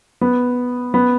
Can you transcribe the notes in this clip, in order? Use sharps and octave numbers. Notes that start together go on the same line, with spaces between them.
B3
B3